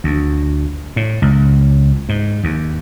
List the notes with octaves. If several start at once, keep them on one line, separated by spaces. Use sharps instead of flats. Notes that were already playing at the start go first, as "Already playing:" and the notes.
D2
A2
C#2
G#2
D#2